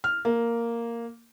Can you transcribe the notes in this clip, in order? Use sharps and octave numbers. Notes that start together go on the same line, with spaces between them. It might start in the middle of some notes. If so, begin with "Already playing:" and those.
F6
A#3